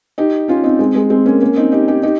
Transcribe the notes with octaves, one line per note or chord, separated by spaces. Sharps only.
D#4 G4
C#4 F4
C4 D#4
G#3 C4
G#3
G#3 C4
A#3 C#4
A#3 C#4
C4 D#4
D#4 G4
D#4 G4
D#4 G4